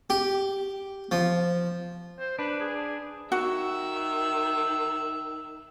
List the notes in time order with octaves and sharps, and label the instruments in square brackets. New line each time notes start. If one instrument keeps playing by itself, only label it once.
[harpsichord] G4
F3
[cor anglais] C5
[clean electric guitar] D4 [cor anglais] B4
[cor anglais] G#4
[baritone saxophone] D#3 [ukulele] F#4 [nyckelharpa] E5